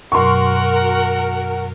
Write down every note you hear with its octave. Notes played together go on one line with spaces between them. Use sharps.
F#2 B2 F#3 F#4 A#4 F#5 C6 C#6